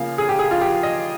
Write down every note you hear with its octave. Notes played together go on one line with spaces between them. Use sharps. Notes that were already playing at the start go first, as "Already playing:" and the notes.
Already playing: C#3 F3 A#3 F5
G#4
G4
G#4
F4
G4
D#5